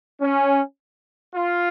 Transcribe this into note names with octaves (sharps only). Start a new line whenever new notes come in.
C#4
F4